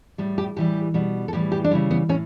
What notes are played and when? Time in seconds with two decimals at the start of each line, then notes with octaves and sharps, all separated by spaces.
0.18 A2 G3
0.38 G4
0.56 A2 E3 G3 G4
0.94 B2 G3
1.28 A4
1.33 A2 E3 G3 G4
1.52 G4
1.64 D4
1.71 C#3 E3 G3 E4
1.91 B3
2.09 A2 C#4